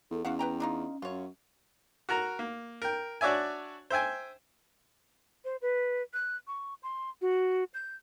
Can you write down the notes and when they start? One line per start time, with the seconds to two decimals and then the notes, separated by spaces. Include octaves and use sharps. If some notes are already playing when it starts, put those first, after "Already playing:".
0.11 E2 A4
0.25 E2 C#4 F#4 F5 F#5
0.39 B4 G5 A#5
0.60 D4 D#4 F4
1.02 F#2 F4 C#5
2.09 F#4 A#4 A#5
2.39 A#3
2.82 A#4 G5
3.21 D4 F#4 C#5 D5 E5 G#5
3.90 C5 E5 G5 G#5
5.45 C5
5.62 B4
6.13 F#6
6.47 C#6
6.83 C6
7.22 F#4
7.74 G6